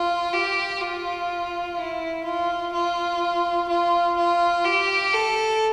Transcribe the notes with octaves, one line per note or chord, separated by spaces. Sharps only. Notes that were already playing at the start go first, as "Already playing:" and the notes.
Already playing: F4
G4
F4
E4
F4
F4
F4
F4
G4
A4